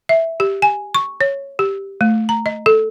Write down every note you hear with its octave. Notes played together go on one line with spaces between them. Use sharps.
E5
G4
G#5
C#6
C#5
G4
A3
A#5
D#5
A4